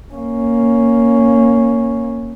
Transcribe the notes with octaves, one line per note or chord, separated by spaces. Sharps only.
A#3 C#4